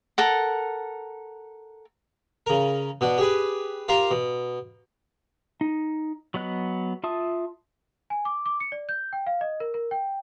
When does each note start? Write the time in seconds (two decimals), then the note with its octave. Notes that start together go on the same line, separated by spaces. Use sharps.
0.18 A4 A#4 F#5
2.46 C#3 A#4
3.01 B2 B3 D4
3.18 G4 G#4 B4
3.88 F4 G4 A#4 C5 A#5 C6
4.11 B2
5.61 D#4
6.34 F#3 B3 D#5 F#6
7.04 F4 E5 A5 D#6
8.10 G#5
8.25 D6
8.46 D6
8.60 C#7
8.72 D5
8.89 G6
9.13 G5
9.27 F5
9.41 D#5
9.60 A#4
9.74 A#4
9.91 G5